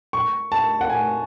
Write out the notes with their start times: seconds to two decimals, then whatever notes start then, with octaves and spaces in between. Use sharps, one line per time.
0.13 C#6
0.52 A5
0.81 F#5
0.90 G#5